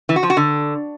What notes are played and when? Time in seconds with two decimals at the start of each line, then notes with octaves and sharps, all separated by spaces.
0.09 E3
0.16 F#4
0.23 F3
0.30 F#4
0.37 D3